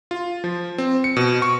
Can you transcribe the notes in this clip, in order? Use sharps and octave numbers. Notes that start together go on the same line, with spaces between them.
F4
F3
C4
C#7
B2
C#6